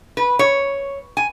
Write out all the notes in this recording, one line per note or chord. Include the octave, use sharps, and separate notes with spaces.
B4
C#5
G#5